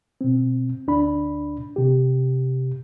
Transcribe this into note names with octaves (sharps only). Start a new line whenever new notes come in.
B2 C4
D2 D4 B5
C3 G4